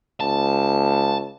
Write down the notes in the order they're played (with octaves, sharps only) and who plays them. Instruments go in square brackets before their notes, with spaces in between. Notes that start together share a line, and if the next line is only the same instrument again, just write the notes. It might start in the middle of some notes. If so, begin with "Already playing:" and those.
[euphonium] C#2 [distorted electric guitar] A5